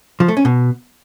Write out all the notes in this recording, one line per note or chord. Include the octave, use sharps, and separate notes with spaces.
F3
A3
C#4
B2